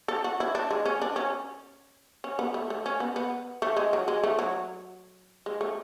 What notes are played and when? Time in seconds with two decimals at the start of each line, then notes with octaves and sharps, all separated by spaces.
0.08 A4
0.24 F#4
0.40 E4
0.55 D4
0.71 G#3
0.85 C#4
1.02 D4
1.16 C#4
2.24 C#4
2.39 B3
2.54 A3
2.70 A3
2.86 C#4
3.00 B3
3.16 B3
3.62 A3
3.77 G#3
3.93 F#3
4.08 G#3
4.23 A3
4.39 F#3
5.46 G#3
5.61 A3